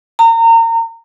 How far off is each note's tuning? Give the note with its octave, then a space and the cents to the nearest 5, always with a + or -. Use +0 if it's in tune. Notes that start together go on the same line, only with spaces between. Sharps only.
A#5 -30